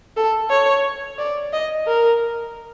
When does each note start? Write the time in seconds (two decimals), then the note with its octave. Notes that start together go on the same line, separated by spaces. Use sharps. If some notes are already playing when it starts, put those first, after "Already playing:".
0.16 A4
0.50 C#5
1.18 D5
1.53 D#5
1.87 A#4